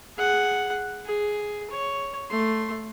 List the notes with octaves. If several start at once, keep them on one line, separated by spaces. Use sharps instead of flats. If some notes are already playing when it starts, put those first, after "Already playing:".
G#4 F#5
G#4
C#5
A3 C6